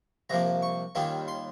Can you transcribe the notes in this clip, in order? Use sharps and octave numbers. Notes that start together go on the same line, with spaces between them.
C2 C3 F3 A#3 A#5
C#6
D#2 D#3 G3 C#4 F4
C6